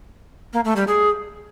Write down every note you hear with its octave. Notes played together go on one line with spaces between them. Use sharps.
A#3
A3
G3
G#4